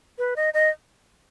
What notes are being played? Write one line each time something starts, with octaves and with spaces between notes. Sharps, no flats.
B4
D#5
D#5